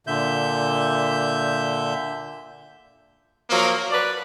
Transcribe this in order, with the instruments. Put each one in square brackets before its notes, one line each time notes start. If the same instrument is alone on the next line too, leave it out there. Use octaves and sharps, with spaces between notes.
[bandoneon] A#2 D3 E5 G6
[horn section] F3 F#3 A#3
B4 D5